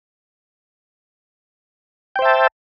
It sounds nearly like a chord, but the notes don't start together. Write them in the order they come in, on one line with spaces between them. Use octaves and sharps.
G5 C5 E5 A5